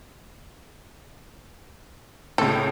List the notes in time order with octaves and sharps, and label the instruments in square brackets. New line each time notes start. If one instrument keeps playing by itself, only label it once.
[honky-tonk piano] C#2 A2 [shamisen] A4